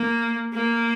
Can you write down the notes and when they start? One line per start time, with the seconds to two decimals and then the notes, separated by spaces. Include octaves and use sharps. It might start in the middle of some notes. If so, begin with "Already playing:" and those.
Already playing: A#3
0.54 A#3